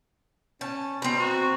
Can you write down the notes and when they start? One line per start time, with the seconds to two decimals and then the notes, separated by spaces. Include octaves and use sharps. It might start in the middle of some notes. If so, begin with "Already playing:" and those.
0.61 C#4 A5
1.02 B2 C4 A#5
1.20 F#4